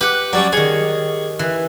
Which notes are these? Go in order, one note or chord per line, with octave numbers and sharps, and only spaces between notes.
G4 B4 F#5
F#3 G3 C#4 D5
D#3 G#4 C#5
E3